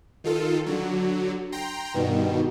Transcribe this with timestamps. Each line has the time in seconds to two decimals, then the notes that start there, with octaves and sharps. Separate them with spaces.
0.24 D#3 F4 A4
0.66 D3 F#3
1.52 G5 A#5 C6
1.94 G2 B2 D#3